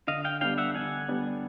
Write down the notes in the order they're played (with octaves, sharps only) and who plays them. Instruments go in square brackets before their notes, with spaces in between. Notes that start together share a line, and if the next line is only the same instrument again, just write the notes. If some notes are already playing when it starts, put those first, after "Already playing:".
[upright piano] D3 [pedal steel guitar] D#5 F5
[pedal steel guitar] F5 G5
[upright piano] G3 B3 D4 [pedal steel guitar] F5 G5
[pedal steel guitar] E5 F#5
[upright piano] D3 [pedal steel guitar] F#5 G#5
[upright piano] G3 B3 D4